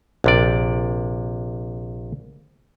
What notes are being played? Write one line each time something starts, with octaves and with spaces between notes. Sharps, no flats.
A#1 C3 D5